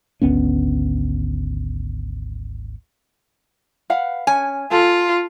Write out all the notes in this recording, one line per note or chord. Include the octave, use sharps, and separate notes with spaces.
G#1 D2 B3 C#4
B4 F5 F#5
C#4 G#5
F4 A4